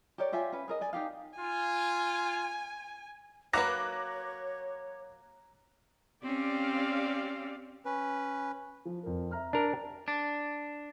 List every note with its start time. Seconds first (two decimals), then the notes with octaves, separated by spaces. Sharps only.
0.18 G4 A#4 C#5 D5
0.32 F4 G4 E5 G#5
0.53 C#4 B4
0.68 G#4 A#4 D#5
0.81 D5 G#5
0.93 D#4 F4 G4 F5
1.38 F4 G#5
3.53 F#3 A#3 B4 C#5 A#5 D6 F#6 A#6
6.22 C4 C#4 G4 D5 F5
7.85 C#4 B4
8.85 F3
9.03 F2 A#4
9.31 E5 A#5 F6
9.53 D4 A#4
10.08 D4